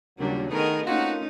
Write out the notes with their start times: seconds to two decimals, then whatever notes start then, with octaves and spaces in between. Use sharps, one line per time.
0.19 D#2 A#2 C#3 F#3 G3 D4
0.51 D#3 A3 B3 G#4 A#4 D#5
0.86 A3 A#3 C4 C#4 D#4 F4 F#4